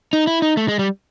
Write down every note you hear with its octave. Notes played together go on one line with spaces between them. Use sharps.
D#4
E4
D#4
A3
G#3
G3